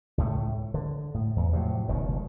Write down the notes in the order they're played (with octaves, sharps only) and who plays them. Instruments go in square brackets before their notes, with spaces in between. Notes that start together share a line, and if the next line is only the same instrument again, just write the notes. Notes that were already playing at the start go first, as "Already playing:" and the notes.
[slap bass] C#2 A2 A3
D3
A2
E2
A2 C3 F3 F#3
F1 C#2 B2 D#3